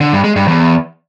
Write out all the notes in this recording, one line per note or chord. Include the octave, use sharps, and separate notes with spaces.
D3
G2
G#3
G2
E2